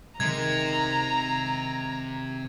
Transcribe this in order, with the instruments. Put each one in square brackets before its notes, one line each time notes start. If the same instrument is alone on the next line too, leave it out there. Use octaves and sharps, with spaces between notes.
[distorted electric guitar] C3 [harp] D#3 G#3 [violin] A#5 [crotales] G#6